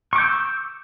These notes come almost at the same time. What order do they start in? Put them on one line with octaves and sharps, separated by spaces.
C#6 D6 G6 E6